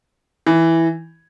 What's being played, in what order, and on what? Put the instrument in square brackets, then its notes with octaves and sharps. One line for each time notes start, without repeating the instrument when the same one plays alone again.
[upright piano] E3